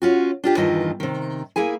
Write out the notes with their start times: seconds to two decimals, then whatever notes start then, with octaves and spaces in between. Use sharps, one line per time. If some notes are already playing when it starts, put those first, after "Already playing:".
0.02 C#4 F4 F#4
0.44 D4 F4 G4
0.57 E2 G2 D#3 E3 F4 D#5
1.00 C3 D#3
1.56 A#3 E4 G#4 G#5